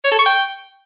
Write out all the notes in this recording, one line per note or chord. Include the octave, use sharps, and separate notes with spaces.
C#5
A4
C#6
G5